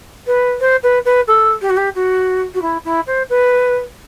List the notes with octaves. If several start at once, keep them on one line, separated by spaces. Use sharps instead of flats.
B4
C5
B4
B4
A4
G4
F#4
G4
F#4
F#4
E4
E4
C5
B4